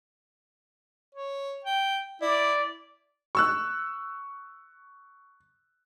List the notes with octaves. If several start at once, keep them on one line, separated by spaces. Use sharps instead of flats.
C#5
G5
E4 D5
C#6 E6 F#6